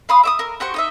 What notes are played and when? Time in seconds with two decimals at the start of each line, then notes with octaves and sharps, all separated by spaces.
0.09 F5 B5 C6 D#6
0.23 E5 D6 D#6
0.39 A#4
0.60 F#4 G4 C5 C#6
0.74 D#4 D#5 E5